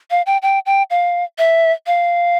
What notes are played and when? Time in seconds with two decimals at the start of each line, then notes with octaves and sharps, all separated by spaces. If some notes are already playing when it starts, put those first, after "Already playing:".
0.11 F5
0.26 G5
0.42 G5
0.66 G5
0.90 F5
1.38 E5
1.87 F5